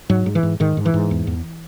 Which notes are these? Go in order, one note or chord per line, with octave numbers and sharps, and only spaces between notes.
G#2 F#3
G#2
E3
G#2
G#2 D#3
G#2
E3
G#2
E2
E2